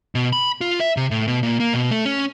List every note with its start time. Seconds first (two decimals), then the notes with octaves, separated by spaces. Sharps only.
0.15 B2
0.33 B5
0.61 F4
0.80 E5
0.97 C3
1.11 A2
1.28 B2
1.43 A#2
1.60 A#3
1.73 B2
1.91 A3
2.05 C#4